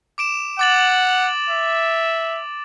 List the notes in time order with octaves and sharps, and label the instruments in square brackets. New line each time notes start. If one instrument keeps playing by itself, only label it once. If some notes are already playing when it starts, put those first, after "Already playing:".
[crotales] D6 D7 E7
[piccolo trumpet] F#5 [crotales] D6 A6 F#7
[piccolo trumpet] E5